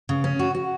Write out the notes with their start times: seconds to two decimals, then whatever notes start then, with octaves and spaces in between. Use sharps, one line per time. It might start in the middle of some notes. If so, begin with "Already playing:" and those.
0.09 C#3
0.24 C#4
0.39 F#4
0.55 F#4